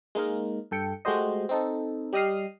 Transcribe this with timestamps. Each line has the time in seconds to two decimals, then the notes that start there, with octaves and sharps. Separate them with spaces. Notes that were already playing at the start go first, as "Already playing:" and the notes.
0.15 G#3 A#3 D#4 A#4
0.71 G2 A4 G5 C#7
1.05 G#3 A3 F#4 G4 C5 D#5
1.49 C4 D#4 A4
2.13 G3 G4 D#5 D#6 F6 C7